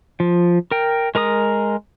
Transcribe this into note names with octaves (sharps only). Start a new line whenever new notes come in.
F3
A#4 G5
G#3 A#4 A#5 D#6